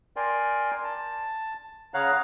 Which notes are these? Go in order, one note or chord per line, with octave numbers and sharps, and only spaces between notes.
A#4 D5 G5 G#5 C6
A5
C#3 C#5 F5 F#5 A#5 F#6